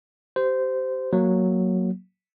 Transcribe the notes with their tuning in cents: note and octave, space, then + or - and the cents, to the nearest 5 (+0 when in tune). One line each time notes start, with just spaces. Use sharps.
G4 -20 C5 -15
F#3 +0 A#3 +0